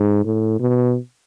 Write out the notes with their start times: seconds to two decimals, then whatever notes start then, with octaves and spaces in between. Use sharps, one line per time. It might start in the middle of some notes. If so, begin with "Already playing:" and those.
Already playing: G#2
0.24 A2
0.60 B2